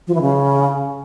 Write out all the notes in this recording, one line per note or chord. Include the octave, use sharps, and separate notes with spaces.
F3
E3
C#3